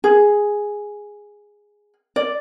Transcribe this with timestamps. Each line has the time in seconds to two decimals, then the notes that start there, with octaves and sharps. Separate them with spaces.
0.04 G#4
2.16 D5